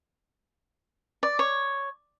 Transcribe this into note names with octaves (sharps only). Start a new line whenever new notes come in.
D5
C#5